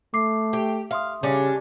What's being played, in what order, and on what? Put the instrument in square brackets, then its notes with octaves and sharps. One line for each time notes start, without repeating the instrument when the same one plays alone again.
[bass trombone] A3 [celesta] D6 C7
[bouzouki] G4
[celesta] E5 C6 D#6 [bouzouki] F5
[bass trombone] C#3 [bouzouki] G3 C#4 D4